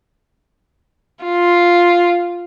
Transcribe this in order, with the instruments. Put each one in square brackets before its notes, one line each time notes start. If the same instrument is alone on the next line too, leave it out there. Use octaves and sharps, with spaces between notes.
[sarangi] F4